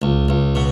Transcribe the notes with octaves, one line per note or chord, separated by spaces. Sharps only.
C#2
C#2
B2